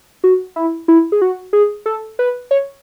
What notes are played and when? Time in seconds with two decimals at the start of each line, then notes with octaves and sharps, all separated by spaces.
0.24 F#4
0.56 E4
0.88 E4
1.12 G#4
1.21 F#4
1.53 G#4
1.86 A4
2.19 B4
2.51 C#5